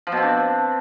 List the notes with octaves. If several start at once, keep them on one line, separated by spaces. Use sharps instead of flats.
F3
B2
C4
D4